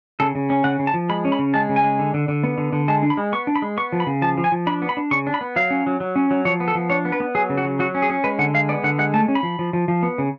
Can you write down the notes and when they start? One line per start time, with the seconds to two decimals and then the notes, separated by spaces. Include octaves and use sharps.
0.20 C#3 A4
0.35 C#3
0.50 C#4
0.64 C#3 F#5
0.79 C#3
0.87 A5
0.94 F3
1.09 G#3 B5
1.25 C#4
1.32 B5
1.39 C#3
1.54 G#3 A5
1.69 C#3
1.76 G#5
1.83 G#3
1.99 D3
2.14 D3
2.28 D3
2.44 B3
2.58 D3
2.72 D3
2.88 G#3 A5
3.03 D4
3.10 B5
3.17 G#3
3.33 B3 C#6
3.47 D4
3.56 B5
3.62 G#3
3.77 B3 C#6
3.92 F3
4.00 B5
4.07 C#3
4.22 F3 A5
4.38 F3
4.44 G#5
4.52 F3
4.67 D4 B5
4.82 B3
4.89 B5
4.97 D4
5.11 C#3 C#6
5.27 D4
5.34 B5
5.41 B3
5.56 F#3 F5
5.71 C#4
5.86 F#3
6.00 F#3
6.16 C#4
6.31 F#3
6.45 F3 C#5
6.60 B3
6.68 A4
6.75 F3
6.90 D4 C#5
7.05 B3
7.12 B4
7.20 B3
7.35 F#3 G#4
7.50 C#3
7.58 F#4
7.65 F#3
7.79 F#3 F#4
7.95 C#4
8.02 G#4
8.10 C#4
8.24 G#3 B4
8.39 D3 F#5
8.54 G#3 F5
8.69 B3 D5
8.84 D3 F#5
8.99 G#3 F#5
9.14 A3 A5
9.28 C#4
9.35 B5
9.43 F3
9.59 F3
9.73 F3
9.88 F3
10.03 B3
10.18 C#3